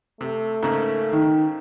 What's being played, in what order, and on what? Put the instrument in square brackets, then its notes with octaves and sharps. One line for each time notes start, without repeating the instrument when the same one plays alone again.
[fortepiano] C3 [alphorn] A3
[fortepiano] G#2 C#3 A#3
[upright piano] D#3